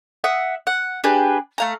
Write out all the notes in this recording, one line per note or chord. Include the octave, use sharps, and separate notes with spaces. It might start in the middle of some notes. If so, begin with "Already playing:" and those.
E5 F#5 D#6
F#5
D4 G4 G#4 B4
A3 F5 A#5